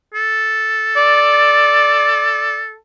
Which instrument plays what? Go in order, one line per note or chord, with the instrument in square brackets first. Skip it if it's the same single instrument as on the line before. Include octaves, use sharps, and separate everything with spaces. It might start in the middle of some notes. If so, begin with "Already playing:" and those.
[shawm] A4
[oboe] D5